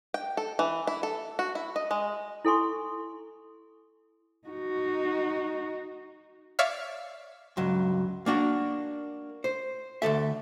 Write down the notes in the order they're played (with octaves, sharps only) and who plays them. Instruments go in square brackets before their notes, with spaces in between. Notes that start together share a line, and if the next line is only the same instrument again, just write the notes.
[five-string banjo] G5
A4
E3
E4
A4
F#4
E4
D#5
G#3
[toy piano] E4 A4 G#5 C6 C#6
[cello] D#4 F#4
[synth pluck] C#5 D5 E5 F5 F6
[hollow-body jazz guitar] C#2 G2 F#3
A#3 D4 F#4
C5
D2 B2 A4 E5